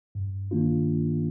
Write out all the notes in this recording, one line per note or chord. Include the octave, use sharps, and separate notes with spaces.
G2
D#3 A#3 D4 F4